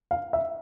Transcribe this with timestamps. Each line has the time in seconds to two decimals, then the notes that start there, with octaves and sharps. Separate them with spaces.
0.11 F5
0.33 E5